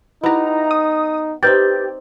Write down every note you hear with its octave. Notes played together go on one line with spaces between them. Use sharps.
B3 D#4 E4 G4 A#5
D#6
C4 D#4 G4 B4 D5 G6 A6